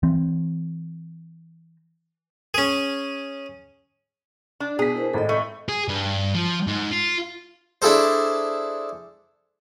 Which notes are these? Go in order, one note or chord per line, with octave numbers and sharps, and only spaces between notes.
E3 C4
C#4 G#4
D4
B2 G#4 B6
E4 A#4 C5
G#1 A2 A4 D#5
A3
G#4
G2
F3
G#2
F4
D4 E4 G#4 A4 C5